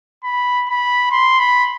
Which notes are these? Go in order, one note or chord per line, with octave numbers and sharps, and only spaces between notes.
B5
B5
C6
B5